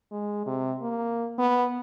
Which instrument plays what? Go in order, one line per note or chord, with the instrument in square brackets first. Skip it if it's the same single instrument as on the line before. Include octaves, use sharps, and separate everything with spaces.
[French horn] G#3
C3
A#3
B3